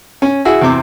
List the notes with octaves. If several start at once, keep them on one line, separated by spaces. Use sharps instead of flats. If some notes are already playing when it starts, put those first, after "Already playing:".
C#4
E4 F#4 G#4
E2 C3 C4 D6